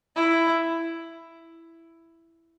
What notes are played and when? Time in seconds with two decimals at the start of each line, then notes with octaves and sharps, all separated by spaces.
0.16 E4